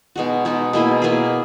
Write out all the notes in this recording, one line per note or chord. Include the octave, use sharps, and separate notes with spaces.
B2 G#3 D#4 F#4
B2 G#3 D#4 F#4
B2 A#3 E4 G#4
B2 A#3 E4 G#4